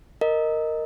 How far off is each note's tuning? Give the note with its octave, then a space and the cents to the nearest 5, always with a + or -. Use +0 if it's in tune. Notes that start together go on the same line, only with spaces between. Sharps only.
A#4 -10 D#5 +0